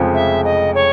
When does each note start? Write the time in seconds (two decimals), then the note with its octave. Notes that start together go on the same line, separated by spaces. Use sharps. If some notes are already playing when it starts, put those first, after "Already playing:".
Already playing: F1 F2 C#3 F3 G#3
0.14 E5
0.44 D#5
0.75 C#5